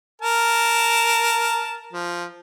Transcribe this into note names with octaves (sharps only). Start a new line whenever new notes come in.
A#4 A5
F3